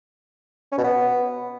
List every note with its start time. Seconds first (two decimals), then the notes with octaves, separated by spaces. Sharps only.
0.72 C#4
0.78 B2
0.84 B3